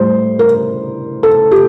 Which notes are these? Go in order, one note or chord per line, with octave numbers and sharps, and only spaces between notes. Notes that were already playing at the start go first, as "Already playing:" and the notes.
Already playing: A2 G3 C5
A#4
A4
G4